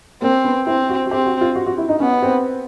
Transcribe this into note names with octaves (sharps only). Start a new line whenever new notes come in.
A#3 C4
B3
C4 E4
F#4
F#4
C4 G4
F#4
F4
F#4
F#4
E4
D#4
B3 C#4
C4